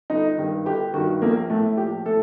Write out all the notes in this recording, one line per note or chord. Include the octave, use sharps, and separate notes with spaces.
G1 D#4
G2 D#3
G1 G4
G2 D#3 F#4
A#1 A#3
A2 A3
A#1 G4
A2 A4